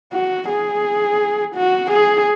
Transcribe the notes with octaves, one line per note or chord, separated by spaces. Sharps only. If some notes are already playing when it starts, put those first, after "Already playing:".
F#4
G#4
F#4
G#4